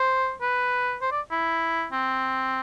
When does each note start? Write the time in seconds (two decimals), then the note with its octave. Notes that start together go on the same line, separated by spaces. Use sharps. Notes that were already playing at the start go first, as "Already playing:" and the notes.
Already playing: C5
0.42 B4
1.02 C5
1.12 D5
1.31 E4
1.92 C4